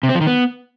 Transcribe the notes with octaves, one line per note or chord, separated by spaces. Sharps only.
C3
C4
F3
D#3
B3